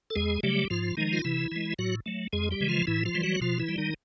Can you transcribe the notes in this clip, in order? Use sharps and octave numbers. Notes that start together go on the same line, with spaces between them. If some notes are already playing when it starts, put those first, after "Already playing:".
A4
E2 G#3 G#4
C#3 F#3 G3 A3 G4
G#2 F3 F4
D#3 F3 G#3 D#4
F4
C3 E3 E4
E3 G#3
A2 F#3 F#4
F#3 A3
F2 G#3 G#4
G3 G4
C#3 E3 G#3
F3 F4
A2 E3 E4
F3 F4
E3 G3
F#3 F#4
B2 F3 F4
E3 E4
G3
D#3 D#4